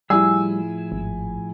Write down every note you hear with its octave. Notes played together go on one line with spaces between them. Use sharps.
A2 F3 G3 E4 G#4 G#5 E6
G#1